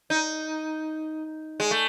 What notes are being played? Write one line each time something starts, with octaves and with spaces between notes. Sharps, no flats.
D#4
G#3
A3